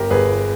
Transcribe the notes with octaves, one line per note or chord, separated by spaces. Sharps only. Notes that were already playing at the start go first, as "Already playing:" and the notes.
Already playing: G1 G4 A#4
G1 G#4 B4